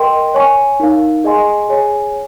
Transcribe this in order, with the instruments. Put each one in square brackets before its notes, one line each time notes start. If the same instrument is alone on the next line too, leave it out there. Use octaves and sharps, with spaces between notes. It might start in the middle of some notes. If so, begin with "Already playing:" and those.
Already playing: [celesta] A#4 D#5 G5 C6
C#5 G#5 C#6
D#4 A#4 F5
G#4 D#5 G#5 C6
G#4 C#5 G#5